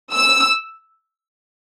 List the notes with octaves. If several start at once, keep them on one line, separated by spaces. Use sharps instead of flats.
E6